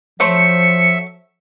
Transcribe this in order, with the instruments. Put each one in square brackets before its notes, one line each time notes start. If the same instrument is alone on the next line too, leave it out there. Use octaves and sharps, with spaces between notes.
[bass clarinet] F3 [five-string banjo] F#3 A3 C5 [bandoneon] E5 [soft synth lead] C#7